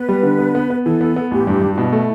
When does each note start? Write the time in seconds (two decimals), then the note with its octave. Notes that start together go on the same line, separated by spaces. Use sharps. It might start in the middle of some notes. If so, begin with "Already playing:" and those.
Already playing: B3 B4
0.09 G3
0.23 D3
0.39 B3
0.55 B3
0.70 B3
0.85 E3 A4
1.01 B3
1.16 B3
1.31 A1 G4
1.47 G2
1.61 G2
1.73 F#4
1.78 B2 E4
1.92 A3